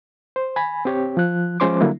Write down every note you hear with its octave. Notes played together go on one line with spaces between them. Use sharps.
C5
G#5 B5
C4 G4 C#5
F3 F#6
F3 G#3 C#4 C5 C6 D6
D3 F#3 G3 A#3 D4 E4